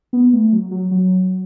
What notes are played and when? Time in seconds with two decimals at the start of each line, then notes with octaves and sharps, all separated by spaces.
0.13 B3
0.33 A3
0.53 F#3
0.71 F#3
0.91 F#3